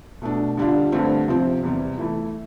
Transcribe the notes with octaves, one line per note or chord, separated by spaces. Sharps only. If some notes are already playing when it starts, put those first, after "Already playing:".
B2 A3 D4
D3 G3 D4 F4
G2 D3 A3 C4
C3 F3 C4
E2 C3 G3
E3 A3 E4